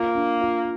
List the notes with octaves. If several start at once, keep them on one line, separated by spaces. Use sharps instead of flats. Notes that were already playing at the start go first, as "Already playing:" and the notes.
Already playing: A#3 F4
D4
F4